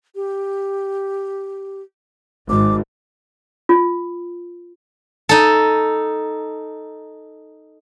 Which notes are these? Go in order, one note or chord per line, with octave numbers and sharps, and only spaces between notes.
G4
G#1 D6
F4
D#4 A4